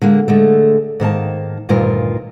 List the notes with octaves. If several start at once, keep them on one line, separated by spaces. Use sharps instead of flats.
D3 G#3 A#3
D3 G#3 A3
G#2 D#3 A#3 A5
D2 G2 A#2 D#3 F4 A#4